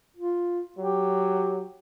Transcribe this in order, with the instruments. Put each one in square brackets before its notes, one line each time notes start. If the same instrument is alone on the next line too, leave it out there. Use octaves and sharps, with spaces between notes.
[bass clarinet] F4
[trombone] F#3 [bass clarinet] G4